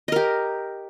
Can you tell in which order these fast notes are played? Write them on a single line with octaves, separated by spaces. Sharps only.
D#5 A#4 G4